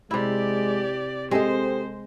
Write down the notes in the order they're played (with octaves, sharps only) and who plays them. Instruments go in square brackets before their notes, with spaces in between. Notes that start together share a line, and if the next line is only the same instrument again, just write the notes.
[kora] C3 E4 [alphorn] G#3 [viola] G4 D5
[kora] G#3 [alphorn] C4 [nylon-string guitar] G4 A4 D#5 [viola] C5